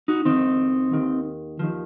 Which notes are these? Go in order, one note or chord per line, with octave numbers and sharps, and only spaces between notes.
D#4 F#4
F2 D#3 C4 D#4
D#2 D#3
D#2 D#3 F3